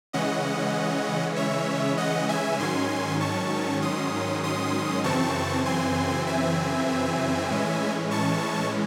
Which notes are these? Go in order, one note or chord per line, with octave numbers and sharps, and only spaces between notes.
C#3 E3 G#3 C#4 D#5 F#5
C#5 E5
D#5 F#5
E5 G#5
G#2 D#3 F#3 C#4 G#5 C6
A5 C#6
C6 D#6
C6 D#6
F#2 C#3 E3 C4 A5 C#6
G#5 C6
E5 G#5
A2 E3 G#3 C#4
A5 C#6